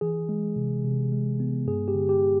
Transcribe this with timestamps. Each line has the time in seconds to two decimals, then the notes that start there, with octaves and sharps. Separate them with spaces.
0.01 E3 G#4
0.29 G#3
0.56 C3
0.84 C3
1.12 G#3
1.40 B3
1.67 G2 G#4
1.88 G4
1.95 D3
2.09 G4